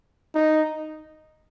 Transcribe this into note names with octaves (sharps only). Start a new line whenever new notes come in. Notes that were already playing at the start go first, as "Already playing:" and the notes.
D#4